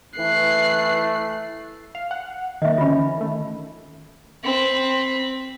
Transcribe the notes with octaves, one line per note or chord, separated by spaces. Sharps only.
E3 A3 F#6 C7
F5
F#5
D#3 A#3 D#5 E5
D3 E3 C#4 F4 B5
D#3 A3
C4 B5